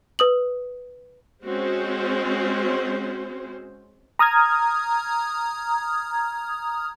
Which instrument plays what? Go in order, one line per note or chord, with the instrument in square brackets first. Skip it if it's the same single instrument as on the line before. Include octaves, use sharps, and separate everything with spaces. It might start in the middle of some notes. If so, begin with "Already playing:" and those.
[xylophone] B4 D#6 F#7
[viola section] G#3 C4 C#4 F#4 C5
[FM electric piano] A#5 D#6 F6 G#6